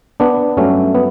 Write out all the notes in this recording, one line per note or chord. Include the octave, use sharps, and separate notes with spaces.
B3 D4
G2 F#3 A3 C#4
B3